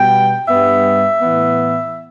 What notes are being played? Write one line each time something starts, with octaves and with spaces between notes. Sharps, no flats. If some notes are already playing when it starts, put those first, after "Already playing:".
Already playing: B2 G3 B3 G5
G2 G3 B3 E5
A2 E3 B3